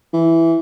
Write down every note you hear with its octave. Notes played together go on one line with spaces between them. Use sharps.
E3